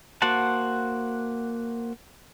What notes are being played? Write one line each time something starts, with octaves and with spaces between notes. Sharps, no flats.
A#3 F#4 C5 F#5 A5